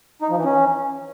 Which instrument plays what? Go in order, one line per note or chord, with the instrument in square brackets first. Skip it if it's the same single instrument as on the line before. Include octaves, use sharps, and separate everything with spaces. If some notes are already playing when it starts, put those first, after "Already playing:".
[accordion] D#4
F3
E3
C#4